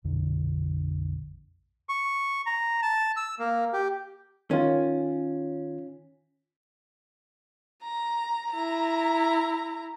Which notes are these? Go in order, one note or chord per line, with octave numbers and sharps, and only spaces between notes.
A#1 F2 B2 D3
C#6
A#5
A5
E6
A#3
G4
D#3 C#4 F4
A#5
E4 A#5